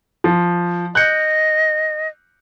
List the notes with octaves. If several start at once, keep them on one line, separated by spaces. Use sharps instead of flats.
F3
D#5 F#6 G6 C#7